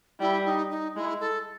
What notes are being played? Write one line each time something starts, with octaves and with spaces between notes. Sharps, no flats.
G3 E4
D#4
D#4
G#3 E4
A4